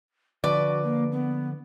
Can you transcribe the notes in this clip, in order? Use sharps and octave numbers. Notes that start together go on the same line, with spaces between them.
D3 F3 F#4 B4 D5
A#3
B3